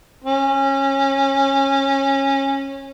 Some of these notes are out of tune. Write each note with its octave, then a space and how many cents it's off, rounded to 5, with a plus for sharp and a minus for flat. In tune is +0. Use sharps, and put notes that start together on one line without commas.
C#4 -20